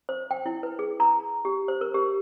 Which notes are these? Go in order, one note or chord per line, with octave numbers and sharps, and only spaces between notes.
C5
G5
E4
B4
G#4
A#5
G4
C5
A#4
G4